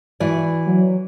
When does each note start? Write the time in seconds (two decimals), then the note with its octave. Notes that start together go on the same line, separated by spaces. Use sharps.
0.20 E3 F#4 D5
0.67 F#3